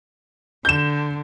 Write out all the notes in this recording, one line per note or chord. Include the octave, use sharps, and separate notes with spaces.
D3 G6 E7